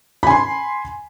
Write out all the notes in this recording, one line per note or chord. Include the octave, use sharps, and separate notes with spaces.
G#5 B5 C6